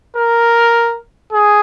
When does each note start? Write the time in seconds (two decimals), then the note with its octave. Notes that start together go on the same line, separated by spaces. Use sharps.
0.16 A#4
1.32 G#4